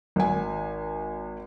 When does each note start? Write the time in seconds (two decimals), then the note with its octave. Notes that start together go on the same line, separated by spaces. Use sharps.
0.16 G#1 G#5